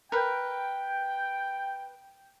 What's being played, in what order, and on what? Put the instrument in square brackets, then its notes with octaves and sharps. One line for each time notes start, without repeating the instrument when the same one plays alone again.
[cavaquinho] A#4 B4 [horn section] G5